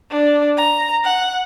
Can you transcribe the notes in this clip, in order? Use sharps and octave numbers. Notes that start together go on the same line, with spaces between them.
D4
A#5
F#5